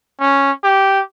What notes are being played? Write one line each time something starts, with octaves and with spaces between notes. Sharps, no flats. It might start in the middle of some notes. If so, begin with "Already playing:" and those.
C#4
G4